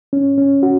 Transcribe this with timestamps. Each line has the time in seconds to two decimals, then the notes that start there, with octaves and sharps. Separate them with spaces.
0.13 C#4
0.38 C#4
0.63 F#4